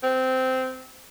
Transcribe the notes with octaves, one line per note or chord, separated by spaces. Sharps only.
C4